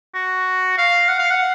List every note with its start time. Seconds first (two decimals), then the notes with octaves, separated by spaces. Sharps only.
0.14 F#4
0.78 F5
1.08 F#5
1.19 F5
1.30 F#5